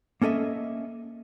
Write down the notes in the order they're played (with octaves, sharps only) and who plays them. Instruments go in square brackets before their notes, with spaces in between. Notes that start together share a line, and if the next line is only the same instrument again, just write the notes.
[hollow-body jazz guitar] A#3 C#4 A4 D#5 E5